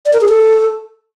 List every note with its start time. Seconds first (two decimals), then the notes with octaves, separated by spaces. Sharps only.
0.06 D5
0.13 A#4
0.21 G#4
0.29 A4